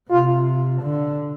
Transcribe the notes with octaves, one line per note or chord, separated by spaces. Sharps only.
C3 F4
D3